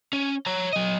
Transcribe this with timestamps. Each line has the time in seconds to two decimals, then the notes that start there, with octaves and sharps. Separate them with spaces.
0.13 C#4
0.46 C#5 A#5
0.73 F#3 D#5